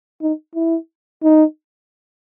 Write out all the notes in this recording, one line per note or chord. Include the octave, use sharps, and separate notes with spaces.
D#4
E4
D#4